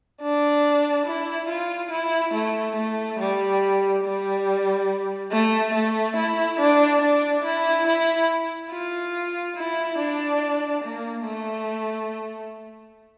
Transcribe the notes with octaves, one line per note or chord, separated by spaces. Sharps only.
D4
E4
F4
E4
A3
A3
G3
G3
A3
A3
E4
D4
D4
E4
E4
F4
E4
D4
A#3
A3